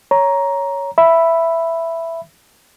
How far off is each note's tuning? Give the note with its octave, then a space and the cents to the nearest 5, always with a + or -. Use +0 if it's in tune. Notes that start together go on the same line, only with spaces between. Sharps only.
C#5 +5 A#5 +10
E5 +5 B5 +0